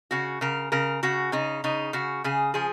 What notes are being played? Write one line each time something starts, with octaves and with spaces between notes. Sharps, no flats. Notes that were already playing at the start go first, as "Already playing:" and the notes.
C#3 F#4
C#3 A#4
C#3 A#4
C#3 F#4
C#3 D#4
C#3 D#4
C#3 F#4
C#3 G#4
F3 G#4